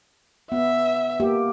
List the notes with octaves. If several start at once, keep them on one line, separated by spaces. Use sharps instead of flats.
B3 E5
A#3 G4